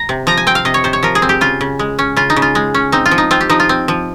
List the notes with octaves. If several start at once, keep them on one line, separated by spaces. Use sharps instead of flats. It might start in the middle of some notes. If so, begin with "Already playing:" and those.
Already playing: A#5
C3
F3 A#5
G#5
C4 G5
F5
C3 D#5
C#5
C3 C5
C#5
F3 A#4
G#4
C4
G4
C#3 F4
C#3
G#3
C#4
C#3 F4
D#4
C#3
F4
G#3
C#4
C4 D#4
F4
F3
D#4
C4 F4
G4
F3 D#4
F4
C4
F3